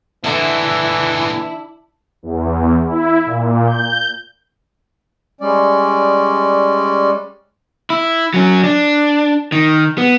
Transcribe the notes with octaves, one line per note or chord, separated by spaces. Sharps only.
A#2 D3 E3 G#3 E4
E2
E4
A#2
G6
G3 G#3 C#4 D5
E4
F#3 C#4
D4
D#3
B3